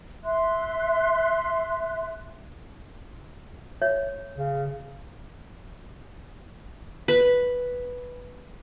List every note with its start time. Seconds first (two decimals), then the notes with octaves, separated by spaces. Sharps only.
0.24 E5 C6 F#6
3.82 C#5 E5
4.35 C#3
7.08 B4